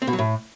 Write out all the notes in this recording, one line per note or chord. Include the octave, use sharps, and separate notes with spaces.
C4
B2
F#3
A2